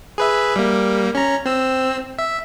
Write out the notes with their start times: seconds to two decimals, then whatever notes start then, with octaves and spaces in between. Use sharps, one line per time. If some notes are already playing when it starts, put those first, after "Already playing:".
0.18 G#4 B4 E5
0.56 G3 A#3
1.15 C#4 A#5
1.46 C4 E6
2.19 E5